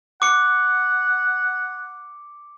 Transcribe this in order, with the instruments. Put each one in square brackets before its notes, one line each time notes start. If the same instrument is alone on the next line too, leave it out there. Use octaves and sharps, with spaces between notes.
[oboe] F#5 [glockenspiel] D6 C#7